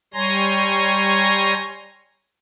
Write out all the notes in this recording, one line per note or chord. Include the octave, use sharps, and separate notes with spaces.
G3 C#5 G#5 A#5 C6 A#6